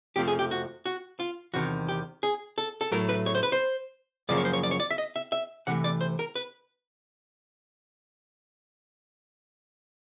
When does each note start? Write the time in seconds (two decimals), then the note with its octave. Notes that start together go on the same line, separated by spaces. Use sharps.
0.16 F2 C3 F3 A3 G4
0.28 G#4
0.39 G4
0.51 F#4
0.86 F#4
1.20 F4
1.54 E2 C3 D#3 F#4
1.89 G4
2.23 G#4
2.58 A4
2.81 A4
2.91 A2 F#3 A3 A#4
3.09 B4
3.26 C#5
3.35 C5
3.43 B4
3.52 C5
4.29 F#2 C#3 F3 A#3 D5
4.37 C#5
4.45 C5
4.53 C#5
4.63 D5
4.71 C#5
4.80 D5
4.91 E5
4.98 D#5
5.16 E5
5.32 E5
5.67 C3 E3 A3 F#5
5.84 D5
6.01 C5
6.19 A#4
6.35 B4